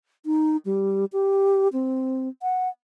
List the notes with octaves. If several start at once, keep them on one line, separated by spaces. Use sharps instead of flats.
D#4
G3
G4
C4
F#5